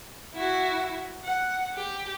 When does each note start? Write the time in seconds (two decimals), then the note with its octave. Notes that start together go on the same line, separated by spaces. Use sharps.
0.34 E4 F#4
1.24 F#5
1.75 G4